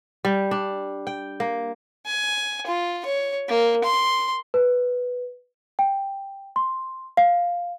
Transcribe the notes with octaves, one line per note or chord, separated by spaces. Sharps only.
G3
D4
G5
A#3
G#5
F4
C#5
A#3
C6
B4
G5
C6
F5